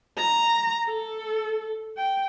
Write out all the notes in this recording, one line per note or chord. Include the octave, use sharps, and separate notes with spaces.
A#5
A4
G5